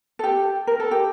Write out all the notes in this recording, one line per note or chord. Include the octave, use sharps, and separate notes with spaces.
A4
G4
A#4
A4
G4